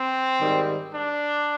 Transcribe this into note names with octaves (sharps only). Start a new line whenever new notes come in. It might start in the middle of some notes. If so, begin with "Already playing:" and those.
Already playing: C4
G#2 D#3 G3
D4